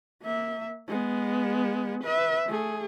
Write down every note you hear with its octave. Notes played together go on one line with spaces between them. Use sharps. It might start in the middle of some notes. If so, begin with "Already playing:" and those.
A#3 E5
G#3 B3
B4 E5
A3 G#4